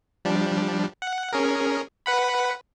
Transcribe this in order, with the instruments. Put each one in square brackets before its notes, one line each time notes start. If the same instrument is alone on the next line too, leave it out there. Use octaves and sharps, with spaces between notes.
[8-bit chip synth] F3 G3 D4
F#5
C#4 G#4 A#4
B4 F#5 B5